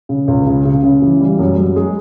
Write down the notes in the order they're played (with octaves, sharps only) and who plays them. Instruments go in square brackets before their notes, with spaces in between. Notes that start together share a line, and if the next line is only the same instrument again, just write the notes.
[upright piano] C#3
C#2
C#3
C#3
C#3
E3
G3
F#2
F#2
G#3